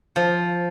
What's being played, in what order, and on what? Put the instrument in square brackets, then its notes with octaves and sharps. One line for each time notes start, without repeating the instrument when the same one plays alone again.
[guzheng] F3